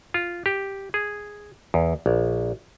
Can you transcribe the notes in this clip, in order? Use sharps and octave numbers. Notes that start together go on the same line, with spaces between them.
F4
G4
G#4
E2
A#1